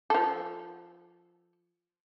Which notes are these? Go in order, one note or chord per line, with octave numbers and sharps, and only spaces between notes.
F3 A4